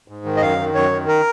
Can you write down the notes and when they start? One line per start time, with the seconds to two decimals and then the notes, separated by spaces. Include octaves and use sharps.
0.08 G#2
0.25 D#3
0.37 D#5
0.42 F#2 F5
0.58 D#3
0.74 F#2 C#5
0.91 D#3
1.08 A#4